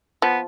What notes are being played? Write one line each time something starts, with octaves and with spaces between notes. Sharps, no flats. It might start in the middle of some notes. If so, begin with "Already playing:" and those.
F3 B3